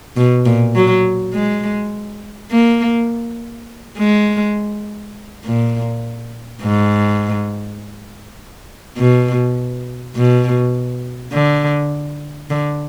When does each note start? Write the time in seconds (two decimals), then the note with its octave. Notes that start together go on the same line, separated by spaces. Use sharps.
0.17 B2
0.46 A#2
0.75 F#3
1.34 G#3
2.51 A#3
3.98 G#3
5.45 A#2
6.62 G#2
8.98 B2
10.15 B2
11.33 D3
12.50 D3